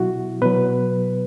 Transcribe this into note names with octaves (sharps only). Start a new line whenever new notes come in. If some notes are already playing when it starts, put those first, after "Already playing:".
Already playing: B2 F#3 E4 F#4
B2 F#3 B4